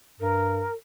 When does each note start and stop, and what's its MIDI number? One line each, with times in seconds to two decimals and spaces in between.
0.20 0.67 43
0.20 0.73 70